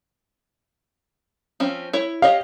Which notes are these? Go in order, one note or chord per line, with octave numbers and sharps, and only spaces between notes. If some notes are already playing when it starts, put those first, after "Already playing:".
F3 C4 C#4
E4 C#5
G4 C#5 D#5 F5